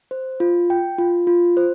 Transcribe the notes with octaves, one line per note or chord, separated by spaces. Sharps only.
C5
F4
G5
F4
F4
C5